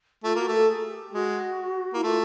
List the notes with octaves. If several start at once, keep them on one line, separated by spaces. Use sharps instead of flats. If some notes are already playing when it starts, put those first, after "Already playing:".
A3 F4
A#3 F#4
A3
A4
G#4
G4
G#3 F#4
A#3 E4
A3 F4